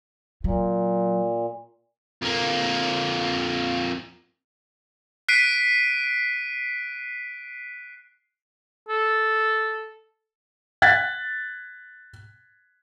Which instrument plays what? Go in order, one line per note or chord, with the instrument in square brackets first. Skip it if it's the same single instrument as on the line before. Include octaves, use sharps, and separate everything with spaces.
[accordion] A#2 [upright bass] F#3
[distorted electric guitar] F2 A#3
[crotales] F#6 B6 C7 D7 D#7
[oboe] A4
[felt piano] F#6 G#6 A6 B6